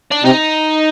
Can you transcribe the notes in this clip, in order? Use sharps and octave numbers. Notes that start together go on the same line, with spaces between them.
D4
C3 C4 D#4